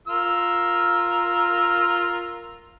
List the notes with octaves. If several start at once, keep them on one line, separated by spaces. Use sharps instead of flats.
F4 A#4 E6